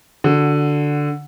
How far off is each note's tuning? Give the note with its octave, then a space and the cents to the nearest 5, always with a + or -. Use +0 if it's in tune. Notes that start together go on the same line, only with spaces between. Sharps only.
D3 +0 F#4 +0